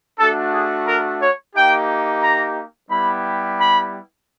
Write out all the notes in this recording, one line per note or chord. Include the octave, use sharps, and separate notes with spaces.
A3 D4 F#4 A4
G#4
A#4
C#5
A#3 D#4 G4 G5
A#5
G3 B3 E4 G4 B5
B5